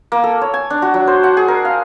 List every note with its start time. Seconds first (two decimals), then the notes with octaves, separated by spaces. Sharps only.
0.12 A#3
0.24 A4
0.41 C#5
0.54 G#5
0.70 D4
0.82 F#4
0.94 F#3
1.07 C5
1.23 F#5
1.37 G#4
1.48 A#4
1.65 F5